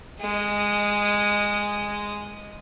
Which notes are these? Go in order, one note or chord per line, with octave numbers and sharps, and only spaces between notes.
G#3 D#5